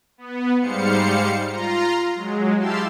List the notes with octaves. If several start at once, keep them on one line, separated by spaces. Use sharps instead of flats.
B3
G#2 G3 C5 F5 C#7
F4 A#5 C6
F#3 G#3
E4 G4 F5 A5 C6 E6